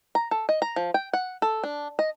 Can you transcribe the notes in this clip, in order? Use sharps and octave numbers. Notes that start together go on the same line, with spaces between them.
A#5
A4
D#5
A#5
F3
G5
F#5
A4
D4
D#5